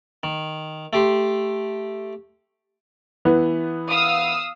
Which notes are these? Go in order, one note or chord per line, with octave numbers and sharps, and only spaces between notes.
D#3
A3 G4 C6
E3 B3
F5 D#6 E6